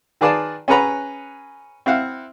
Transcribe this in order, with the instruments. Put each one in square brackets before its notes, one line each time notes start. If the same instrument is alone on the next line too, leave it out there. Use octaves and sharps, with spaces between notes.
[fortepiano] D#3 G#4 B4 D5 F5 A5
C#4 G#4 B4 F#5 A#5 B5
C4 E4 F5 F#5